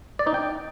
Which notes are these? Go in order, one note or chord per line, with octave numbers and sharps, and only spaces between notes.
D5
D#4
G5